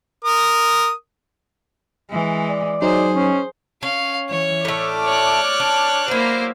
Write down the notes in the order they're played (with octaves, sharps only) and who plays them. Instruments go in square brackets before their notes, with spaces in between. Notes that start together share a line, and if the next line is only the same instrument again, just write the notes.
[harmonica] A#4 D#6
[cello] E3 G#3
[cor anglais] D5
[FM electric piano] F#3 D#4 [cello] G#4 C5
[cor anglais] C#4
[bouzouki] C#4 [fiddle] F5
[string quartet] E3 [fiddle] C#5
[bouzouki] A2 A3 [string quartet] D5 D6 F6
[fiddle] C#5 F#6
[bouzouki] D4
[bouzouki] F#3 E4 [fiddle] A#3 C5